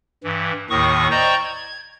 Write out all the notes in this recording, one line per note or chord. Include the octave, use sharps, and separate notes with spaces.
G2 E3
D#2 A2 D#3 C#6 D#6
C5 D5 D#5 G5 A#5 C#6
G#6